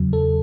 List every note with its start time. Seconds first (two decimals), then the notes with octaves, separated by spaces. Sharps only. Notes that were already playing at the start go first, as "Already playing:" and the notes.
Already playing: E2 C#3 F#3
0.13 A4